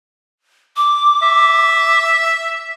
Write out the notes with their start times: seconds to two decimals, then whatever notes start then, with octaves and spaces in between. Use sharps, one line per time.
0.77 D6
1.22 E5